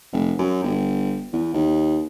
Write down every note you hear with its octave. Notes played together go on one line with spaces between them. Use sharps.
F1
F#2
G1
E2
D#2